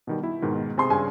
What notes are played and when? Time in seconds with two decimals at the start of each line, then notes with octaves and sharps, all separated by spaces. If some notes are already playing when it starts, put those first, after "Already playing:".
0.07 B2 D#3 G3
0.23 E4
0.42 G#2 B2 D#3
0.78 C3 G#4 C6
0.90 G2 C#3 G#5